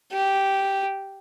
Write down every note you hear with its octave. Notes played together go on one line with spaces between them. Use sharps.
G4